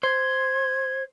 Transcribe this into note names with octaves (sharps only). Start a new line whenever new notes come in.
C5 G#6